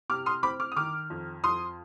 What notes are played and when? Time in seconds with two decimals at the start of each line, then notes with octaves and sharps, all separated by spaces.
0.10 C3 D6 F6
0.26 C6 D#6
0.43 C4 B5 D6
0.60 D6 F6
0.72 D#6
0.76 D#3 D6 F6
1.10 F2
1.44 F2 C6 D#6